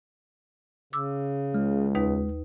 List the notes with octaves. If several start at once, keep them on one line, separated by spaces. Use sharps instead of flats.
C#3 D6 E6
C#2 G#3
D#2 D#4 B4